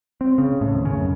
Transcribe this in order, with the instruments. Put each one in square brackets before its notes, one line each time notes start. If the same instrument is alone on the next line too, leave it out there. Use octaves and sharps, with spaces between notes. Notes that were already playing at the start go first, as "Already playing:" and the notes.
[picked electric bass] C4
C#3
A2
D#2
C#3
F#2